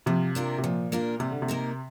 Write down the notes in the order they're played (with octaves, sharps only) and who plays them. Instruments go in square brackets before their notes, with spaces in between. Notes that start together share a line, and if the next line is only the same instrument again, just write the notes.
[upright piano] C3 [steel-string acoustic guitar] F3
[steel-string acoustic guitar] A#3 D4 F4 A#4
[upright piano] C3
[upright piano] A#2 [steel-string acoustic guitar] F3
[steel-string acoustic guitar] A#3 D4 F4 A#4
[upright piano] C3 [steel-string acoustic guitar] G3
[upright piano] D3
C3
[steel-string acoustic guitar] A#3 D#4 A#4